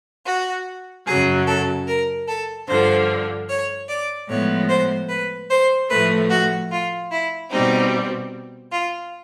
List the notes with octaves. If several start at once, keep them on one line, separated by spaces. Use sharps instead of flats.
F#4
F#2 C#3 F#3 G#4
A4
A#4
A4
G2 D3 F3 C5
C#5
D5
A2 F3 G#3 B3 C#5
C5
B4
C5
A2 F3 A3 B4
F#4
F4
E4
B2 G3 C4 D#4
F4